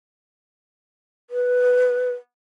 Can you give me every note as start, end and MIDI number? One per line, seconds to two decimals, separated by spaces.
1.30 2.12 71